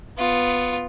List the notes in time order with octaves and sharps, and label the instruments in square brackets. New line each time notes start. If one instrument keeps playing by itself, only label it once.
[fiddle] B3 F4